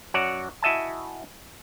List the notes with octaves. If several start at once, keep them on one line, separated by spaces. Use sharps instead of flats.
F#2 F#4 C#5 D5 F#5
E4 F#4 D#5 E5 G#5 A5